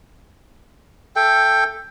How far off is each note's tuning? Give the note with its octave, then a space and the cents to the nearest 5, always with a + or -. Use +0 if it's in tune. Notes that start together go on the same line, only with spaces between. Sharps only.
A4 +0 E5 +10 G5 +10